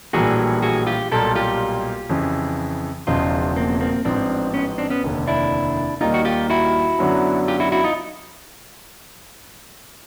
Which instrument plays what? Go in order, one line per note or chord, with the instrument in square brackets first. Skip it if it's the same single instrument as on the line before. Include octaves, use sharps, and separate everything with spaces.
[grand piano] A#1 A2 E3 G3 A#3 [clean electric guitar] F#4 G#4
[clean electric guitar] F#4 G#4
F4 G4
[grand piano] B1 A#2 G3 A#3 [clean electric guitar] G4 A4
[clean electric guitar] F4 G4
[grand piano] F2 C#3 E3
[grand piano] E1 E2 C#3 F3 [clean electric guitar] D#4 F4
[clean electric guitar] A#3 C4
A#3 C4
[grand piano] A1 G#2 F3 [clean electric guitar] C4 D4
[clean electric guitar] B3 C#4
C4 D4
B3 C#4
[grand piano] F1 D#2 D3
[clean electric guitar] D4 E4
[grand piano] D#2 D#3 G3 A#3 [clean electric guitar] D#4 F4
[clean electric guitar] F#4
F4 G4
E4 F#4
[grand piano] F#2 D3 F#3 B3 D4
[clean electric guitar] F4 G4
E4 F#4
E4 F#4
D#4 F4